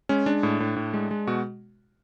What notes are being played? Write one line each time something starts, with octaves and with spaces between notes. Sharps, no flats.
G#3 C#4
G#3 D4
A2
A2
A2
G#3
G#3
B2 F#4